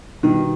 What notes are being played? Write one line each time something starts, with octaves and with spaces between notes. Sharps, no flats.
B2 D#3 G3 B3 D#4 F#4